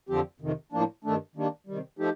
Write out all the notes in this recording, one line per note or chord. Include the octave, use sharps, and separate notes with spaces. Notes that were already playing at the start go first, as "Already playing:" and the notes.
F2 D3 F3 C4 G4
F2 C3 D#3
A2 F3 A#3 D4
G2 D#3 A3 D4
D#3 G3 A#3 D4
C3 D#3 G3
F3 A3 D#4 G4